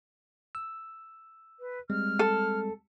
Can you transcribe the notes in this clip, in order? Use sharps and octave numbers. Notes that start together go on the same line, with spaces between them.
E6
B4
G3 G#3 C4 F6
A4